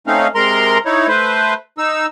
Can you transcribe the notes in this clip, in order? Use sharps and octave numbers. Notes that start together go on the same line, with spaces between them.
A3 C4 C#4 D#4 F5
C3 G#3 A#4 A#5 C6
D#4 E4 C#5
A3 B4 C5
D#4 E6